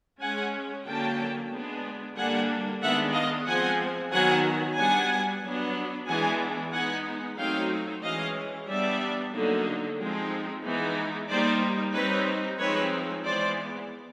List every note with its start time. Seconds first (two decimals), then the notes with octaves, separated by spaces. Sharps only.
0.20 G#3 C#4 F#5 G#5
0.86 D3 F#3 A#3 C#4 G5 A5
1.51 G#3 B3 D4
2.16 D3 G3 A#3 D4 F#5 G#5
2.81 D#3 G#3 B3 D4 E5 F#5
3.14 D#5 F5
3.46 F3 G#3 C4 F#5 G#5
4.12 D#3 F#3 B3 F#5 G#5
4.77 G3 B3 D4 F#5 G#5
5.42 F#3 B3 D4
6.07 E3 G#3 B3 D4 F#5 G#5
6.72 G#3 B3 D#4 F#5 G#5
7.38 F#3 A3 C4 D#4 F5 G5
8.03 E3 G#3 C#4 D#5 F5
8.68 G3 B3 D4 D5 E5
9.33 D3 F#3 A#3 D#4
9.99 F3 G#3 C4 D#4
10.64 E3 G#3 B3 D#4
11.29 G3 A#3 D#4 C5 D5
11.94 G3 C4 D#4 B4 C#5
12.59 F3 G#3 C4 D#4 B4 C#5
13.24 E3 G#3 B3 C5 D5